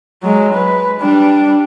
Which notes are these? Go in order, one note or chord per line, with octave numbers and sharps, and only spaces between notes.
F#3 G#3
B4
G3 D4